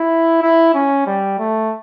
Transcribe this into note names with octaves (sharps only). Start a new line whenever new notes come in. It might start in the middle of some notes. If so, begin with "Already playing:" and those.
Already playing: E4
E4
C#4
G3
A3